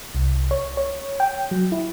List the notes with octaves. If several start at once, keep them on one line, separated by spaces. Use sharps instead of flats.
C2
C#5
C#5
G5
F#3
E4